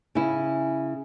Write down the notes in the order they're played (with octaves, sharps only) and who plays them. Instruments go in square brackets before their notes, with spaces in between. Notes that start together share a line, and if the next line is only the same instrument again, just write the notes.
[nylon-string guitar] C#3 E4